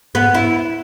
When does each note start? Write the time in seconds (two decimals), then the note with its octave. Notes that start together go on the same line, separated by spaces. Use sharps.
0.15 B3
0.34 E4